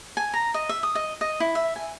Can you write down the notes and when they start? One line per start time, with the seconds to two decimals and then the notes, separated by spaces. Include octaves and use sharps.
0.17 G#5
0.34 A#5
0.54 D#5
0.69 E5
0.83 D#6
0.95 D#5
1.21 D#5
1.40 E4
1.55 E5
1.76 G#5